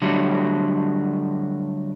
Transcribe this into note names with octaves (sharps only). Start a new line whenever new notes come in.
D3 F#3 G3 A3